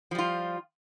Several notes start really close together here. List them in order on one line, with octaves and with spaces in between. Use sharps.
F3 G3 F4